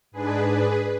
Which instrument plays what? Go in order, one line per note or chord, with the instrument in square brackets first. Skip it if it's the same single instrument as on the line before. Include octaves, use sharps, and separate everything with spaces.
[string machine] G#2 G#3 D4 G#4 B4